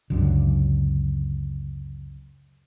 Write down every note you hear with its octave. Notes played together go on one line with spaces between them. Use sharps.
C#2 F#2 D3